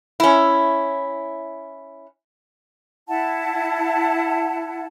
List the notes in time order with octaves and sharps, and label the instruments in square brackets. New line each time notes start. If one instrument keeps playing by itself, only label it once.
[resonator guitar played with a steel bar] C#4 E4
[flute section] E4 F#5 A5